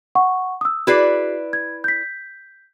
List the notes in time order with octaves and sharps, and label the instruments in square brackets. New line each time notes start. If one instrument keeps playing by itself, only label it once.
[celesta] F#5 C#6
D#6 E6
[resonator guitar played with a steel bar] E4 B4 D5 [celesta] F#4 G#4 C7
[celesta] G#6
G6 B6